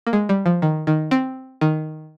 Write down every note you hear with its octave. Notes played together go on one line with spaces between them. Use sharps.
A#3
G#3
G3
F3
D#3
D#3
C4
D#3